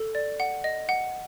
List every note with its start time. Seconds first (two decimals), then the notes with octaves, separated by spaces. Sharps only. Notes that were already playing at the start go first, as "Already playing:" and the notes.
Already playing: A4
0.15 D5
0.40 F#5
0.64 D#5
0.89 F#5